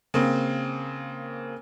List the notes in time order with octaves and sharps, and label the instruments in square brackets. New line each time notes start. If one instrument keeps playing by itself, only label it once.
[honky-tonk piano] C#3 A#3 C4